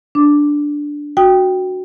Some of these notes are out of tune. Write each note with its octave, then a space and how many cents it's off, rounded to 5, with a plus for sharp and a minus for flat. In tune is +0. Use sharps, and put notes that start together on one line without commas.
D4 +0 D6 +0
F#4 +0 G5 +0 D#6 +0